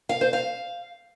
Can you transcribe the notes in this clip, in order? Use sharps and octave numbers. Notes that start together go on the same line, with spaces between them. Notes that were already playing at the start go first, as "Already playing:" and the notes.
F5
C5
F5